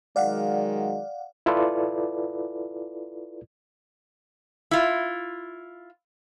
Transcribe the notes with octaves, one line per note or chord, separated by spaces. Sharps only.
D#3 F#3 G#3 D5 F5 F#5
E4 F4 A4 B4 D5
E4 F4